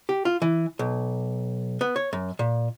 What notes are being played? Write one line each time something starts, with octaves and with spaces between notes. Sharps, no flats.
G4
F4
E3
B1
B3
C#5
F#2
A#2